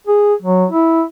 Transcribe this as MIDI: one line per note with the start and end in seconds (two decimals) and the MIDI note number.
0.07 0.34 68
0.42 0.66 54
0.71 1.03 64